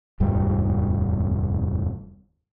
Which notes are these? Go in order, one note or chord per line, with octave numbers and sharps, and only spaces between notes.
F1 D#2 G#2 G3